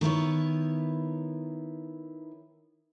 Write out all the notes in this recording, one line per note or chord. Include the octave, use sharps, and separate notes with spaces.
D#3 B3 E4 C#5